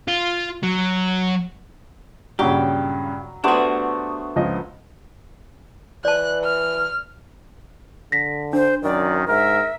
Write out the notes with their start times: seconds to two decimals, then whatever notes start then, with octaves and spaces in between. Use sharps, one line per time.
0.08 F4
0.63 F#3
2.39 G2 A#2 C#3 F#3 G4
3.44 A3 B3 D4 F#4 G4 C5
4.36 C#2 F3 D#5
6.05 E3 D5 A5 F#6
6.44 F6
8.12 D3 A#6 B6
8.53 D4 C5
8.83 F#2 D#3 D5
9.28 G#2 A#4 E5